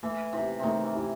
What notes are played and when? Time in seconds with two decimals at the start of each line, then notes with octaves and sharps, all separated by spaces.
0.03 E3 A3
0.33 C3 E4
0.38 G4
0.59 C3 D#3 A3
0.84 E3
0.94 E4 G4